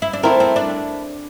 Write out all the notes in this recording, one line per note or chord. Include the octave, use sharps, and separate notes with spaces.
E4
D4
A3 C4 E4 A#4
C4
D4